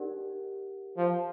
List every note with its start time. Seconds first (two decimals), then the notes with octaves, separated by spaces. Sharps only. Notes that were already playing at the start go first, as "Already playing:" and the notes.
Already playing: D#4 G4 A#4 D5 F#5
0.97 F3